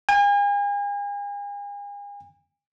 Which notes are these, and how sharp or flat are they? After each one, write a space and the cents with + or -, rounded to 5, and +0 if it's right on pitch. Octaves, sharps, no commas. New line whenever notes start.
G#5 -40